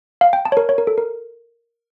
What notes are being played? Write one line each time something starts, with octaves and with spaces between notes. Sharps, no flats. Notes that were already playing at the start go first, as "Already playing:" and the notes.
F5
G5
A5
C#5
A#4
C#5
A#4
A4
A#4